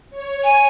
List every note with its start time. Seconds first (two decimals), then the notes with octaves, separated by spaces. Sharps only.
0.10 C#5
0.44 G#5